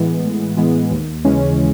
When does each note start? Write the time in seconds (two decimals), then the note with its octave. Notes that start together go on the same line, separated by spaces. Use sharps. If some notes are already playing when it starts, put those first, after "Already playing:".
Already playing: A2 E3 G#3 B3
0.23 A2
0.57 E3 G#3 B3
0.91 D#2
1.25 C#3 E3 G#3 C#4